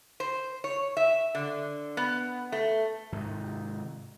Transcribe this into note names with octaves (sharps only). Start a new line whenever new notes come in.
C5
C#5
E5
D3
B3
A3
G#2 C3 D#3